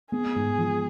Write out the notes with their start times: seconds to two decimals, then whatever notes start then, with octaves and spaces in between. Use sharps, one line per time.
0.12 B3 G#4
0.36 G#2
0.58 F3